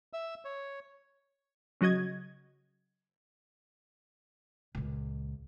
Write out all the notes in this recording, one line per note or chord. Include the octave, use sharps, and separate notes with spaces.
E5 E6
C#5
C#3 F#3 F#4 D#5 G#6
C#2 A#2